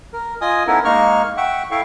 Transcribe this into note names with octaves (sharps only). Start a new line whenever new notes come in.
A#4
F4 D#5 G#5 D#6
B3 C#4 D#4 E4 A4 A#4
G#3 A#3 D#4 C#6 F6
E5 F#5 G5 C#6
E4 A4 F5 G5 C#6